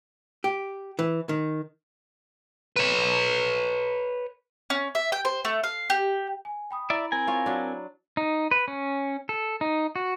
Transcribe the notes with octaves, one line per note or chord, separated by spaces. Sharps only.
G4
E3
D#3
B4 C#5
C#4
E5
G5
C5
A3
F5
G4
G#5
G5 B5 D#6
E4 D5 E5 A#5 B5
C4 A#4 G#5
F4 C#5
F#3 D4
D#4
B4
C#4
A4
D#4
F#4